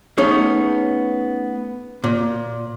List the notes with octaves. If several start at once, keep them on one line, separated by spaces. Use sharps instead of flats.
A3 B3 C#4 D#4 G#4
A#2